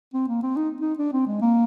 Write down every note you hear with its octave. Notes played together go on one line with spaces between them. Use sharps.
C4
A#3
C4
D#4
D#4
D4
C4
G#3
A#3